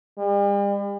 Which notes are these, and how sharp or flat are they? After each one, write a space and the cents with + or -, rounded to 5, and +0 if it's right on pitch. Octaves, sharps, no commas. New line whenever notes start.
G3 +40